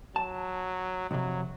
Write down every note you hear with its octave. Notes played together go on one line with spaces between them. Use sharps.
F#3 A5
B1 F2 C3 F#3